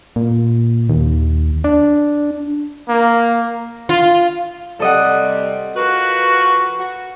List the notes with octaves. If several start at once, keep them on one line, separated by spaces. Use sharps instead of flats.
A#2
D#2
D4
A#3
F4
C3 G3 A4 D#5 F#5
F3 F#4 A#4 B4
F#4